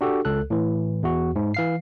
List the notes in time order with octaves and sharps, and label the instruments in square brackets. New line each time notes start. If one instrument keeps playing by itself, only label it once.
[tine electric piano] D4 F#4 G4 A4
C#2 A4 F#6
A2 E3
E2 F#4
G#2
E3 F5 C7